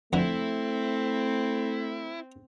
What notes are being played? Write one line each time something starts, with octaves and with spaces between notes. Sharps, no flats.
F2 D3 A3 C4 E4